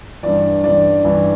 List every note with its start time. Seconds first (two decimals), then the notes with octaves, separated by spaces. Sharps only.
0.23 G2 E3 D5
0.64 G2 E3 D5
1.05 G2 E3